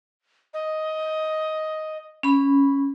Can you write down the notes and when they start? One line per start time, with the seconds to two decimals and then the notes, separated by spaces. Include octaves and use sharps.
0.54 D#5
2.23 C#4 B5